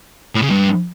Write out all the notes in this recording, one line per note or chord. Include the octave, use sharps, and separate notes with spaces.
A2
C#3
G2